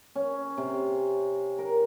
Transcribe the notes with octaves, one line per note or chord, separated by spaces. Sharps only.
C#4
C3
A#4